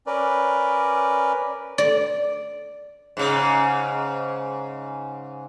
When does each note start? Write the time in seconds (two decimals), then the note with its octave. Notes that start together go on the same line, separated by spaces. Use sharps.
0.07 C#4 A#4 B4 D5
1.78 D5
3.17 G#2 C#3